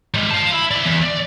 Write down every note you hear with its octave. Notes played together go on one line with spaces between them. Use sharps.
G3 G#3
F5 A5
E4
D5 E5
E2
D5